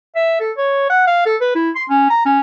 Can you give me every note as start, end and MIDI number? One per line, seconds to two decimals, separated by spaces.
0.16 0.40 76
0.40 0.51 69
0.58 0.86 73
0.90 1.07 78
1.07 1.26 77
1.26 1.36 69
1.41 1.52 71
1.55 1.70 64
1.75 1.84 84
1.89 2.10 61
2.10 2.22 82
2.25 2.40 61